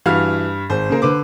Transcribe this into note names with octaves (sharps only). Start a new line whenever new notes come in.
G2 E3 F#4 F5 F6
G#1 C5
C#3 A#3 A#4
D3 B4 D6